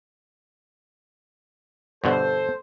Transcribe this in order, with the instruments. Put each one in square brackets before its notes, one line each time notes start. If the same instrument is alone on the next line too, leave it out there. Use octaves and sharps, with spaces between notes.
[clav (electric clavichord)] G2 B2 D3 [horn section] A4 C5